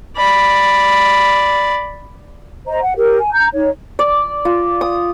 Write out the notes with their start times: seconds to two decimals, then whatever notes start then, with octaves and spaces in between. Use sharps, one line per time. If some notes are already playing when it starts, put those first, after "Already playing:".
0.17 D5 B5
2.67 C5 D#5 A#5
2.82 F#5
2.96 G4 A#4
3.18 G#5
3.33 A#5 G6
3.53 D#4 C#5
3.99 D5
4.45 F4
4.81 D#6